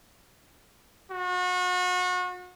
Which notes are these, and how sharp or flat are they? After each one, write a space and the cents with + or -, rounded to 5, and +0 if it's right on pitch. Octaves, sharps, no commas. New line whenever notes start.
F#4 -35